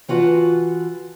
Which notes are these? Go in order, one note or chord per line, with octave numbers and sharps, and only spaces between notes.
E3 F4 F#4 B4 E5 A5